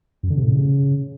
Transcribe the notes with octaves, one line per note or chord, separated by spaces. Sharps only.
F#2
D3
C3
A2
C#3